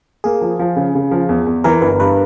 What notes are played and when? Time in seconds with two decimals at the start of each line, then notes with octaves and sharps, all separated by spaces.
0.24 A#3 G#4
0.41 F3
0.59 F3
0.76 C#3
0.95 C#3
1.11 F3
1.29 E2
1.46 E2
1.64 E3 A#4
1.82 G1 B4
2.00 G2 B4